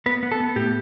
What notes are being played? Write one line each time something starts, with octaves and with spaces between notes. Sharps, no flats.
B3 B4
B3
A4
B3
A2 G4